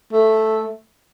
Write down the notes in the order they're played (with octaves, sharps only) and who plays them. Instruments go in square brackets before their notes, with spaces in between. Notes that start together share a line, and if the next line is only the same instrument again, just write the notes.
[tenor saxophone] A3